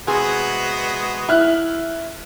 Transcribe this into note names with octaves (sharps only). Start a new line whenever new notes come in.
C3 G#3 B3 F#4 G#4
E4 F6 F#6